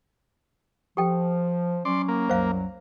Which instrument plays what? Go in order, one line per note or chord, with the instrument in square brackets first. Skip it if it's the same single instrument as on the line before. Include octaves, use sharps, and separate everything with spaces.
[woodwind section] F3 [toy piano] G4 A4 G5
[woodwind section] F#3 C#4 [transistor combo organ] D5 C6
[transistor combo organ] A#3
[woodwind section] C2 F#2 F#3 [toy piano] C5 F5